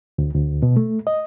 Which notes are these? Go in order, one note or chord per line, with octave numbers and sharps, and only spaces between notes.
D2
D2
B2
A3
D#5